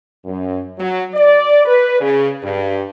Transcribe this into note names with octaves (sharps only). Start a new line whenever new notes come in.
F#2
F#3
D5
B4
C#3
G2